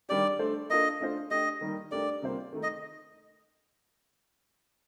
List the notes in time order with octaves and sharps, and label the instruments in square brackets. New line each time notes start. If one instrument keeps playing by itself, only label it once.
[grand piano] D#3 G3 D4 G4 [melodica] D5
[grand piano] A3 D4 A4 C5
[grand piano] A#3 D4 F4 A4 [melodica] D#5
[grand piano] A3 D4 F4 C5
[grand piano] A3 D4 G4 [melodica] D#5
[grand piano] D#3 G3 A#3 D#4
[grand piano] A3 D4 G4 A#4 [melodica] D5
[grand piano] C3 G3 A#3 F4 C5
D#3 A3 D#4
[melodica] D#5